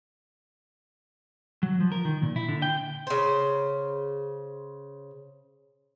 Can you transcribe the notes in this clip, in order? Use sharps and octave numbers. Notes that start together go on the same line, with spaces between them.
F#3
F3
A#4
D#3
A#2
E4
D3
G5
C#3 C5